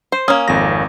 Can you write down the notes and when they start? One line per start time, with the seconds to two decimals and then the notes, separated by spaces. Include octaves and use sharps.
0.12 C5
0.28 A#3 C#4 D#6
0.48 G#1 F2 A#6